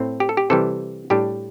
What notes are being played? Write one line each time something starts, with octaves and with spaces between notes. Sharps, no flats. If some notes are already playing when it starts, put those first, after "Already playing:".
Already playing: A2 A3 C4
G4
A4
G4
C3 E3 G3 A4
A2 G3 D4 G4